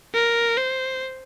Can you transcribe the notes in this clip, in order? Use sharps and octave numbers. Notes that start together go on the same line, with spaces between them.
A#4
C5